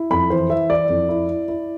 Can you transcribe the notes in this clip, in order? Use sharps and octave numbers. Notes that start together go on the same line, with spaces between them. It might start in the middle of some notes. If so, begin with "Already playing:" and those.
Already playing: E4
F2 B5
E3 C5
E3 E5
E4 D5
F2
E4
E4
E4